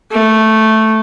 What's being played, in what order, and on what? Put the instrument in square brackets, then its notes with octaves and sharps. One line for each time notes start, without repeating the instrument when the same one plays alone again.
[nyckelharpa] A3